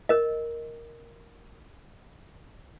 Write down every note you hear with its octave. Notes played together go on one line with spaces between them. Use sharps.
A#4 D#5